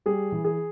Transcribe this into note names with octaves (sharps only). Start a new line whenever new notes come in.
G3 G#4
E3
G#4